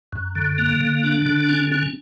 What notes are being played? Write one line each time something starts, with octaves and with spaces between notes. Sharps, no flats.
F#2
D3
A#3
D3
D4
D3
C#4
C#4